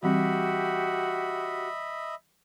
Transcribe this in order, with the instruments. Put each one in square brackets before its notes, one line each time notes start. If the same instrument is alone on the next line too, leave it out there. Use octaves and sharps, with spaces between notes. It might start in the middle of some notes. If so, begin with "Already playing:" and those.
[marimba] E3 G3 C4 [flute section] F#4 G4 [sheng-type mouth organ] D#5 E5 B5